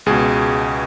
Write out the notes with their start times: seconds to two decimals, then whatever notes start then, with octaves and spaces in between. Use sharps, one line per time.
0.06 C#2 B2 G#4